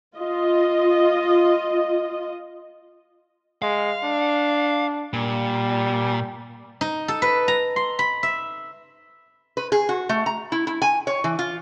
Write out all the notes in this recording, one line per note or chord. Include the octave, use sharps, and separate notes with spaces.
F4 D#5
G#3 F5
D4
A#2 G3
D#4
A4
B4
A#5
C6
B5
E5
B4
G#4
F#4
A3
A#5
E4
E4
G#5
C#5
E3
F4